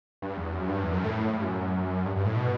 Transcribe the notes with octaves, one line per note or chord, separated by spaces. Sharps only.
G2
E2
F#2
G2
E2
F#2
A2
G2
F#2
G2
G2
A2
B2